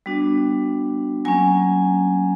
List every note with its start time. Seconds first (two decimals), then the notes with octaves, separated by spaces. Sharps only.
0.06 G3 B3 D4 F#4
1.25 F#3 A#3 C#4 G#5